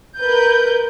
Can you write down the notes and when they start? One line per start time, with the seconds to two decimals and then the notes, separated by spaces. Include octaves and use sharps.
0.19 A#4 B4 G6